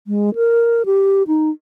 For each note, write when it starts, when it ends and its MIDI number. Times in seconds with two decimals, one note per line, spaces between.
0.07 0.35 56
0.35 0.86 70
0.86 1.23 67
1.28 1.50 63